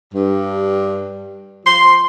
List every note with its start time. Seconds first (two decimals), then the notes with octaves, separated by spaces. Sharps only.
0.13 G2
1.65 F3 C6